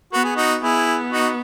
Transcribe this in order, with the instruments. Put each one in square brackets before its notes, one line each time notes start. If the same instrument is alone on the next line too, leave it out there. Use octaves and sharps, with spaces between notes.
[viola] B3 [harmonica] F#4
[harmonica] G#4
D#4 F#4
[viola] B3 [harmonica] E4 G#4
[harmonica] D#4 F#4